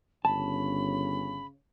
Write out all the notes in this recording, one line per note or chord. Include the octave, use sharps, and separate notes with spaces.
G1 C#3 C#4 A5 B5